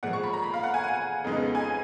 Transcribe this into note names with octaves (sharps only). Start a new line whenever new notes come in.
A#2 F3 G#3 F#5
C#6
B5
A#5
B5
F5
F#5
G#5
F#5
F2 C#3 G#3 B3 D#4
G#5